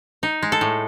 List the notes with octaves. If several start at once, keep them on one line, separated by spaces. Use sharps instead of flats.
D#4
G#3
A4
A2